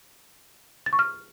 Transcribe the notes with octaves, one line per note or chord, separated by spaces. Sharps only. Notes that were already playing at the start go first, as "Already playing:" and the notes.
A6
C#6
F6